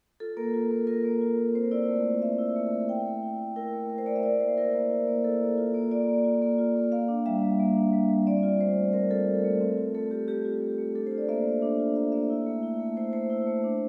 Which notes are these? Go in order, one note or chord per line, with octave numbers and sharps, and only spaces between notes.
F4 A4
A#3 A#4
F4
A#3
F4 A#4
A#3
F4
A#3
C4 C5
E4 D5
A3
A3
C4 E5
E4
A3
A3
E4 G5
A3
E4
A3
E4 A#4
A3
E4 A#4
C5
A3 D5
E5
E4 D5
A#3 C5
E4 A#4
A#3
E4
A#3
E4 A4
A#3
F4
A#3
F4 D5
A#3
F4
A#3
F4
A#3
A#3 F5
D4
G3 E5
G3
A#3
D4
G3
G3
C4 D5
F4
A3 C5
A3
C4 A#4
F4 A4
A3
A3
C4
F4
A3 A4
A3 G4
C4 G4
F4
A3
A3
D4 A4
F4 C5
D5
A#3 E5
A#3
D4
F4
A#3 E5
A#3 E5
E4
A3
E4
A3
E4 C5
A3 C5
E4
A3
D4